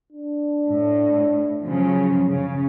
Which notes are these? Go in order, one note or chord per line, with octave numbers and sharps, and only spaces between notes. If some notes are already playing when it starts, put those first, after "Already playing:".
D4
A2
C#3 F3 F#3
C#3